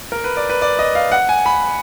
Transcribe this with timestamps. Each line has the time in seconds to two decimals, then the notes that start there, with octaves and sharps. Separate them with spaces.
0.12 A#4
0.24 B4
0.37 D5
0.50 B4
0.62 D5
0.79 D#5
0.95 F5
1.12 F#5
1.29 G#5
1.46 B5